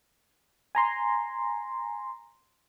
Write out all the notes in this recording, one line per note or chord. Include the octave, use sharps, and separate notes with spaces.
G#5 A#5 C6